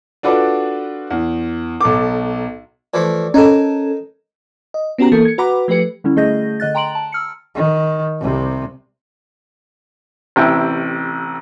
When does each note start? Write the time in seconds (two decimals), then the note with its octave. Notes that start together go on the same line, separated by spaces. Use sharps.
0.23 D4 F4 F#4 A4 B4 D5
1.10 E2
1.81 B1 A4 D6
2.94 E3 F3 A3 D5
3.34 C#4 D#4 A4 A#4
4.74 D#5
4.98 B3 C#4 F#4 G4 A#5
5.12 E3 A#3 A4
5.25 G#6 C#7
5.38 F#4 B4 F#5 A#5 B5 D6
5.68 F3 A3 G4 B4 C#7
6.04 D3 G3 C#4 E4
6.16 D3 A3 G#4 D#5 G6 A#6
6.60 D3 D#5 F#6 A6
6.75 G5 A#5 C6 D7 F#7
6.95 A5
7.12 E6 F6 C#7
7.55 D#3
8.20 C2 C3
10.36 A1 C3 E4 G5